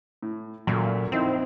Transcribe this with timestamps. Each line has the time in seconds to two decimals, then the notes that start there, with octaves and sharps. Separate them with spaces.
0.22 A2
0.67 F#2 A#2 A3
1.12 F2 C4 D#4 E4